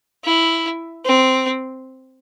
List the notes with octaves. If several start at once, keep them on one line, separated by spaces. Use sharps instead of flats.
E4
C4